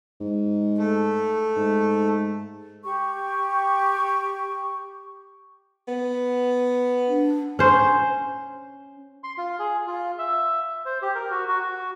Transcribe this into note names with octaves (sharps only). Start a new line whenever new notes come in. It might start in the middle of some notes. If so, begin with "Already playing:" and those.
G#2
A3
G#2
G4 C#6
B3
D4
C#4 C5
C6
F4
G#4
F4
E5
C5
G4
A#4
F#4
F#4
F#4